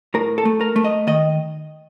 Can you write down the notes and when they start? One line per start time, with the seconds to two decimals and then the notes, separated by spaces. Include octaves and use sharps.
0.14 A2 A#4
0.38 A4
0.45 A3
0.61 A#4
0.76 A3
0.84 D#5
1.07 D#3 D#5